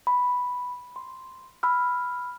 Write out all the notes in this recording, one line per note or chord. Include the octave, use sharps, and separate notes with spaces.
B5
C6
B5 E6 F6